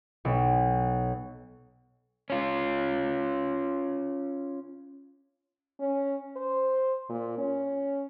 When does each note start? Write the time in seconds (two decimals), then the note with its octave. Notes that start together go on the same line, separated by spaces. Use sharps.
0.25 B1
2.30 C#4 F4
5.80 C#4
6.36 C5
7.10 A#2
7.38 C#4